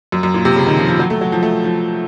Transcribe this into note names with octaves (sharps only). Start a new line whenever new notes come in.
F#2
F#2
A#2
C3
C#3
D#3
F3
F3
F#3
A3
F#3
F3
A3
F3